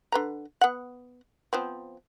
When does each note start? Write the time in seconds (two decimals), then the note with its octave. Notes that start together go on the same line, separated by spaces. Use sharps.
0.12 D3 B4 A#5
0.61 B3 F#5
1.53 F3 B3 C4